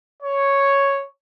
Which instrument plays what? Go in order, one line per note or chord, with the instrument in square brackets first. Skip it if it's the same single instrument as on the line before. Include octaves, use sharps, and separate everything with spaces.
[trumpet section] C#5